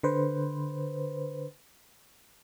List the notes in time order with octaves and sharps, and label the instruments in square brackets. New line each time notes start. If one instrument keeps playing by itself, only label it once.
[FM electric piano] D3 B4 C5